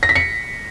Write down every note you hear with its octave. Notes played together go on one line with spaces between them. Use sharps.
A#6
B6
C#7